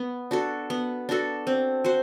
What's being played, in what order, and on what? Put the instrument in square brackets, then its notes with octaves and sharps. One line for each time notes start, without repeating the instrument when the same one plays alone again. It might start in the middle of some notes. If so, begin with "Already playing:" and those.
Already playing: [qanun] B3
D4 F#4 A4
B3
D4 F#4 A4
C4
F#4 C5